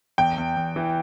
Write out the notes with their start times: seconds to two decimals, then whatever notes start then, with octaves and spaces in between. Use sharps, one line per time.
0.18 E2 G5
0.38 E2
0.57 E2
0.76 E3